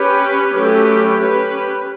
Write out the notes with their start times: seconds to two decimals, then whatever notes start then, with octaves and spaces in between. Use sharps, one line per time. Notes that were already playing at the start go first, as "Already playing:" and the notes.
Already playing: C#4 G4 B4
0.54 F#3 A3 C#4 G4 B4
1.20 C#4 G4 B4